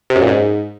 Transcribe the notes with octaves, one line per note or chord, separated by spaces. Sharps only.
C3
F#2
A#2
G#2